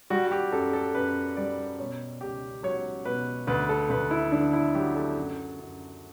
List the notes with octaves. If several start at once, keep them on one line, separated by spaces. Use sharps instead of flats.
G3 F#4
F#4
G4
F#2 A4
A4
F#2 B4
G3 D5
B2 C#5
C#2 G4
F#3 C#5
B2 B4
D2 B4
A4
D2 B4
E4
D3 D4
E4
F#3 G4
A4
F#2
F#2